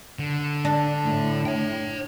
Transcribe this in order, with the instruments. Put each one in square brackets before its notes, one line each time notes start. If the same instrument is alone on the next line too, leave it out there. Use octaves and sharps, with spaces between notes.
[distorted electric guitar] D3
[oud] D4
[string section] A2
[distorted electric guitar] C#5 G5